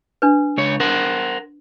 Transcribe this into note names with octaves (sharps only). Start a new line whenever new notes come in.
D4 B4
C#2 C#5
A#4 C5 F#5